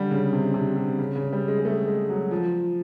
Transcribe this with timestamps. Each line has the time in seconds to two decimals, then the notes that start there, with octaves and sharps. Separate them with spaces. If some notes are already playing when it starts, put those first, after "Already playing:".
Already playing: D3 G3
0.11 C#3
0.33 C3
0.54 C3
0.76 C3
0.98 C#3
1.16 C#3
1.33 G3
1.48 G#3
1.60 G#3
1.65 A3
1.87 G#3
2.10 F#3
2.31 F3